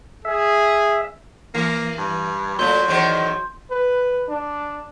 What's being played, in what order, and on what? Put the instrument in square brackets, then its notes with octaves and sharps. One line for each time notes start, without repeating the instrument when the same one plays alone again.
[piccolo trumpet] G#4 [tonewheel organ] E5
[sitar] E3 [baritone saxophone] A#3
[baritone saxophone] G2
[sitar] A#2 A3 [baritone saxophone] F#3 [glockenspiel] C6 G6
[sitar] E2 D#3 C5
[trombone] B4
D4